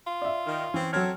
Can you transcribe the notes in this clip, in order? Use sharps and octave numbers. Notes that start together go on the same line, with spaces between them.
F4
D5 E5
D#3
E3 C4 C#4
F#3 C4 C#4 A4 C#5 F6